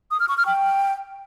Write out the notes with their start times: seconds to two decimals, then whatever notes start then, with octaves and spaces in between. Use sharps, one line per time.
0.11 D#6
0.20 F6
0.29 C#6
0.37 F6
0.46 G5